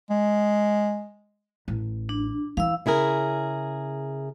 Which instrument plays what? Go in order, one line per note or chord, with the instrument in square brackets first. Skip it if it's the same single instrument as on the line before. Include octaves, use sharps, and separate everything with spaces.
[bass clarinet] G#3
[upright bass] A1
[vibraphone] D4
[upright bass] E3 [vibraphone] F5 E6
[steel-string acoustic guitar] C#3 E4 G#4 A#4